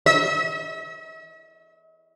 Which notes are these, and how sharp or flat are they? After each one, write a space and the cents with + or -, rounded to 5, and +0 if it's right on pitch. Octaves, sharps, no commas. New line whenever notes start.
E5 -45